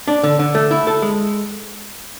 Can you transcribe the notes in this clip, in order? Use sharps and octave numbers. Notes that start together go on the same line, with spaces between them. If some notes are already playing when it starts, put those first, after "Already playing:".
D4
D3
D3
A3
E4
A4
G#3